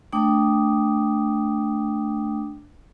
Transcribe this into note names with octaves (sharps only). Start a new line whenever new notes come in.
A3 D4 G5 D6 D#6